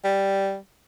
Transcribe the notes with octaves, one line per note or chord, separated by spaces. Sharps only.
G3